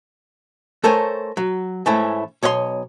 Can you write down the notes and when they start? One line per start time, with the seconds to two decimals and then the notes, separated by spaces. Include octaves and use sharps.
0.84 A3 A4 A#4 C5 C#5 G#5
1.37 F#3
1.86 G#2 E3 A3 C#4 E4
2.43 B1 C#5 D#5 F5 C6